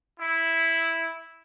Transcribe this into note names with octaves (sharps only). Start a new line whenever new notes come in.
E4